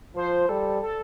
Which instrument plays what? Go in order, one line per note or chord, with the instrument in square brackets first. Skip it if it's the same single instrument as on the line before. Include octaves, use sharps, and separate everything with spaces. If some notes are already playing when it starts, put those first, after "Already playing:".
[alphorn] F3 [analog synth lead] C5
[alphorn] G3 [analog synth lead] A4
[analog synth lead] A4